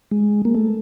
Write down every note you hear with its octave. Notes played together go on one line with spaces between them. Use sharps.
G#3
A#3
A3